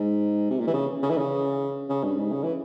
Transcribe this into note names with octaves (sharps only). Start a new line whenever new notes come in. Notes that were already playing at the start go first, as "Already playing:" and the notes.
Already playing: G#2
C3
A#2
E3
C#3
C#3
E3
C#3
C#3
G2
G#2
C#3
E3